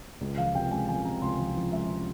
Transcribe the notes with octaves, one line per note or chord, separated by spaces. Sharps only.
C#2
F3 F5
C3 G5
G#3 G#5
F3 G#5
C3 A#5
C#2 C6
F3
F3
G#3 E5
C3